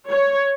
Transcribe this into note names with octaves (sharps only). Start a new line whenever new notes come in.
C#5